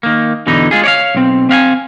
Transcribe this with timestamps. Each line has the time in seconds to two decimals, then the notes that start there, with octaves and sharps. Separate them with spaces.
0.03 D#3 A#3
0.47 E2 B2 D3 E3 D#4
0.71 G#3 F4 G#4
0.83 C#5 D5 F5
1.15 B1 C4
1.49 C4 F5 F#5 G#5